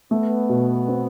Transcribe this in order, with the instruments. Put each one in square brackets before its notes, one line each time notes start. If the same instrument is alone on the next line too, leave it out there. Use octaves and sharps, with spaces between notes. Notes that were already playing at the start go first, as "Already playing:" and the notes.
[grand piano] A3 [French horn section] B3
[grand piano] B2
C4